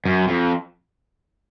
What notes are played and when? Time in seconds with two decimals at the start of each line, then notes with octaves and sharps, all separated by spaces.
0.05 F#2
0.28 F2